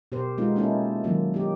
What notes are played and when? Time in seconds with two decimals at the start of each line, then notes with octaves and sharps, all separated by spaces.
0.12 B2 G4 A#4 C5
0.38 G#3 B3 D#4 F4
0.56 A#3 C#4 D#4 E4 A4
1.04 D#3 F#3 A#3
1.34 D#4 G4